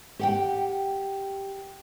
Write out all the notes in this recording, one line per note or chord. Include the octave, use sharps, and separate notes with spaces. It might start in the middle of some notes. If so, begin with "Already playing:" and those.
G4 F#5 G5